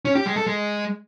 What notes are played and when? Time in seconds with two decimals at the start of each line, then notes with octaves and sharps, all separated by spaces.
0.05 C#4
0.15 G4
0.26 G#3
0.36 A4
0.47 G#3